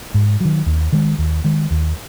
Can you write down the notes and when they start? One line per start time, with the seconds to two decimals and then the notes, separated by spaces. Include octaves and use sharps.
0.14 G#2
0.41 D#3 F#3
0.66 D#2
0.92 D#3 G#3
1.18 D#2
1.44 D#3 G#3
1.71 D#2